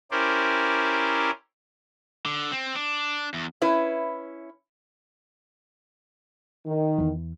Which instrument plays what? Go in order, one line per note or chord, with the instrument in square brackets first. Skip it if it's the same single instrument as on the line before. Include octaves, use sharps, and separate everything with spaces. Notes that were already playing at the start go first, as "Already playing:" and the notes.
[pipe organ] C#4 E4 G4 A#4 C5 D5
[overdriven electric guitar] D3
C4
D4
E2
[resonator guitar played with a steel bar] C#4 E4 B4
[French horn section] D#3
[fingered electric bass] E2 E3